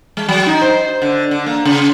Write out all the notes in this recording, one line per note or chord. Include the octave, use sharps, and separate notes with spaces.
G#3
F#3
D#4
C5
D3
D3
A#3
C#3